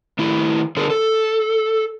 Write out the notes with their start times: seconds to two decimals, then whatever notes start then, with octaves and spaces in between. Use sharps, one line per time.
0.19 D#3 A3 E4
0.77 D3 G#4 A#4
0.90 A4